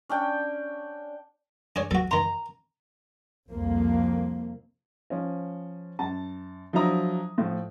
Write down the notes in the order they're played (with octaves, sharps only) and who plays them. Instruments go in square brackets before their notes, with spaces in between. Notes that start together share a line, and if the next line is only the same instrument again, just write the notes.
[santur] C#4 D4 G5
[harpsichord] D4 G#4 C#5
[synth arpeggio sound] A1 D#2 F#3 [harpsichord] F#4 A4
[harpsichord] D#3 C6 [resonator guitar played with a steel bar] A#5
[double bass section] C2 F2 A#3
[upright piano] F3 C#4
F#2 A5
F3 F#3 D4 E4 A#5 D#6
A2 F3